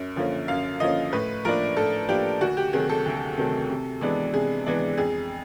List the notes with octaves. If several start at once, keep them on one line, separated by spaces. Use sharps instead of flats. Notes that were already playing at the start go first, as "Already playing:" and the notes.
Already playing: F#2
D3 F3 A#3 C#4
F#2 F5
D3 F3 A#3 C#4 D#5
A2 B4
F3 A#3 D4 A#4
A2 A4
F3 A#3 D4 G4
D2 F#4
G4
C3 D#3 F#3 A3 G#4
A4
D2
C3 D#3 F#3 A3
C3
E3 G#3 B3 D4
C3 G#4
E3 G#3 B3 D4
F2 G#4